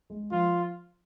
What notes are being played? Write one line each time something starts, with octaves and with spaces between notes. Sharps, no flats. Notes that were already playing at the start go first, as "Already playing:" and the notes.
G#3
F3 F4